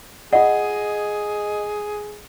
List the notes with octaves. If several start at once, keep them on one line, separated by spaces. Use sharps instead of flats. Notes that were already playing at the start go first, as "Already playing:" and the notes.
F4 G#4 D#5 F#5